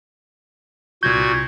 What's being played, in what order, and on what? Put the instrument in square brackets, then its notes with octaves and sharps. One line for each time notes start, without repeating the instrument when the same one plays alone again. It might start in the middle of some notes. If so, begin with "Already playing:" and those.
[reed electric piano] C2 G6 [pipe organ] A#2 F#4 G#6